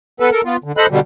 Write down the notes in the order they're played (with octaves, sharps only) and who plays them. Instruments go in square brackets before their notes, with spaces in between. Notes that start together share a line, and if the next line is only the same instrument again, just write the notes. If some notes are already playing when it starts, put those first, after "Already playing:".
[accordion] B3 A4 B4
A4 A#4
B3 F4
D3
A4 C5 D#5 B5 F#6
B2 D3 G3